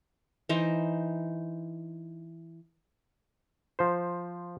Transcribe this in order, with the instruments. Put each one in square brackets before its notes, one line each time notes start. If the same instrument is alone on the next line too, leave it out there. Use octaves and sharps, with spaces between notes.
[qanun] E3 D#4 C5 A#5
[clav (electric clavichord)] F3 C5